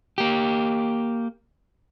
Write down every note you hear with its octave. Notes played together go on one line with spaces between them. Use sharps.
A#3 G4